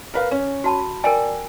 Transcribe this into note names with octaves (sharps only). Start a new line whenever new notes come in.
A#4 B4 F5
C#4
F#4 A5 B5
A#4 D5 G5 G#5 D7